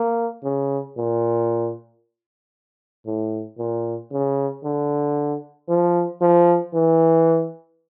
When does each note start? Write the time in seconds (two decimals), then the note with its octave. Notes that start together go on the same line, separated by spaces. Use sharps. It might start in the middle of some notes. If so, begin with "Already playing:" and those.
Already playing: A#3
0.44 C#3
0.97 A#2
3.06 A2
3.59 A#2
4.11 C#3
4.64 D3
5.68 F3
6.21 F3
6.74 E3